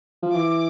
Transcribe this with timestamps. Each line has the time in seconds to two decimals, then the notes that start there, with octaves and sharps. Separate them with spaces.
0.23 F3
0.33 E3 D6